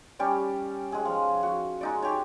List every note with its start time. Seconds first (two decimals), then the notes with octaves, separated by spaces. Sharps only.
0.19 G3 C#4 G4 D5
0.92 G#3 G#4
1.05 F3
1.43 F#4
1.81 G#3 D#4 D5
2.02 G4 C#5